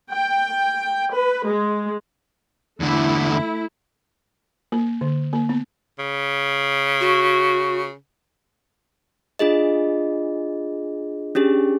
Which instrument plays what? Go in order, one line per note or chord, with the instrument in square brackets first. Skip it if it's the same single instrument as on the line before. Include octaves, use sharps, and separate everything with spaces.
[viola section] G5
B4
G#3
[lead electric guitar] E2 D3 [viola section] A3 E4
[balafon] A#3
D3
A#3
B3
[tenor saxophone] C#3
[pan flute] F#4
[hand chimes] D4 F4 G#4 D#5
C#4 D4 G4 G#4